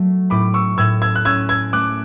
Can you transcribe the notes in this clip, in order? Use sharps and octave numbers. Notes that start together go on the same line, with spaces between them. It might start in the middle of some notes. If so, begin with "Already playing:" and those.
Already playing: F#3 A3
A2 B5 D6
C#6 E6
A2 E6 G#6
E6 G#6
F#6
C#4 E6 G#6
E6 G#6
A3 D6 F#6